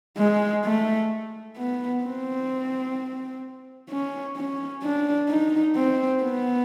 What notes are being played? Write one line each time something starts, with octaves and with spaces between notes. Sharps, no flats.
G#3
A3
B3
C4
C#4
C#4
D4
D#4
C4
B3